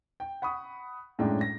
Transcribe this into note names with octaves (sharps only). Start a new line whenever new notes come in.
G5
F#5 B5 C#6 D#6
F#2 A2 G#3 D4 G5
A#6